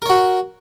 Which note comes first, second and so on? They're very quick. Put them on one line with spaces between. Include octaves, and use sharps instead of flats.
A#4 C#5 F#4